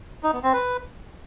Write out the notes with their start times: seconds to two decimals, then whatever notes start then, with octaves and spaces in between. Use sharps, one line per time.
0.23 D#4
0.33 B3
0.43 C4
0.53 B4